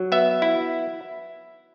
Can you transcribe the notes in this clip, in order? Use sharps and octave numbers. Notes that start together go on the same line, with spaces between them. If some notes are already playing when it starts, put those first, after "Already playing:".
Already playing: F#3
B3 E5
E4